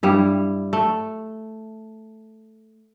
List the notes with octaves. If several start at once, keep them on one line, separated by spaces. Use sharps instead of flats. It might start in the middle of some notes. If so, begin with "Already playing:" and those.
G2 G3 E4
A3